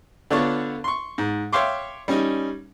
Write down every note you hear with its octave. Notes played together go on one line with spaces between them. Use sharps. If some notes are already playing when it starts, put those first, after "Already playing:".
D3 B3 D4 F4 C#5 C#6
C6 C#6
G#2
C#5 E5 F5 G5 C6 D6
G3 C#4 D#4